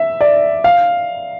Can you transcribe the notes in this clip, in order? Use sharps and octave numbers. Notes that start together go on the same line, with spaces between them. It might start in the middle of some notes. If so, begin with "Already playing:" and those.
Already playing: E5
D5
F5